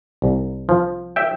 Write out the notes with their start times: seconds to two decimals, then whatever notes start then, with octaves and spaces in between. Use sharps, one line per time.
0.22 C2
0.69 F3
1.16 E5 G5